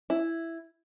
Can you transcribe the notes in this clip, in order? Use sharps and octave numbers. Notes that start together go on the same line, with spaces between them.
E4